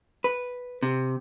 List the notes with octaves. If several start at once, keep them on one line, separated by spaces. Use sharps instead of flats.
B4
C3